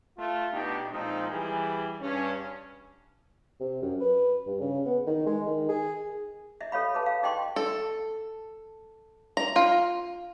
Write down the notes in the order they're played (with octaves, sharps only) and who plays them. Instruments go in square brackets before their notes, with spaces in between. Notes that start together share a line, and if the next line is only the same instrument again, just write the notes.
[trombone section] A3 F4
B2 D4 D#4 G4
A#2 F3 G#3 C4 D#4
E3 G3 G#4
G2 C#4
[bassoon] C3
F#2
B4
G2
C#3
B3
D#3
G#3
D#3
G#4
[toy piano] D#5 E5
A4 C#5 F5 B5
G#4 B4 A5
F5
G#4 D#5 G5 C6 C#6
[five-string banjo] A4
A#5
F4